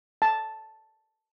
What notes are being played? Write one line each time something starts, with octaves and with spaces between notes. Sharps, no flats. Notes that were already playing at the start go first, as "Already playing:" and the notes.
A5